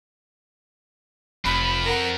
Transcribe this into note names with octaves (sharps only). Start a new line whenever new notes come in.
F1 F2 F3 B5
A#4 F#5